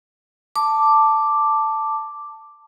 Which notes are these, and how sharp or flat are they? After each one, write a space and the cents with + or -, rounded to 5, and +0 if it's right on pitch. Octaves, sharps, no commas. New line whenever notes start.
A5 +5 D6 +0